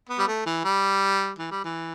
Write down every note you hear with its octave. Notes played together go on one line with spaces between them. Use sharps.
B3
G3
A3
E3
G3
E3
G3
E3